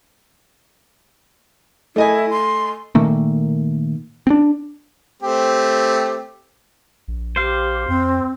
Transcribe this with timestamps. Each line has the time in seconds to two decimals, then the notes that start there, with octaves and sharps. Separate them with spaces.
1.96 A3 E4 D#5 G#5
2.30 C6
2.95 A#2 D#3 A3 A#3
4.27 C4 D4
5.23 A3 C4 G4
7.08 A#1
7.36 G4 C5 F5
7.88 F2 C4